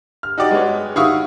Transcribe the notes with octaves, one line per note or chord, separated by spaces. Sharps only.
F6
D#4 F#4 G4 D5
G#3 B3 F#4 B4 C#5
D#3 E4 F#4 F5 C#6 D#6